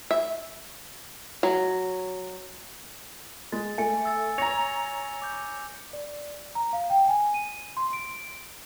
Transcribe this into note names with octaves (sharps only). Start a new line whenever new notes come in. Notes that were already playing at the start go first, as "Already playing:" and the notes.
E5
F#3
G#3 A6
A3 G#5 C#7
E6 A6
C#5 A#5 A#6 C#7 F7
D6 G6
D5
A#5
F5
G5
G#5
D#7
C6
D7